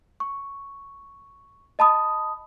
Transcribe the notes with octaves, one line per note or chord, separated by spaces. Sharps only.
C#6
D#5 A5 B5 D#6